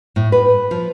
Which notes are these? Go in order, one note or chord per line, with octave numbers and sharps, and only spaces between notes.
A2
B4
F3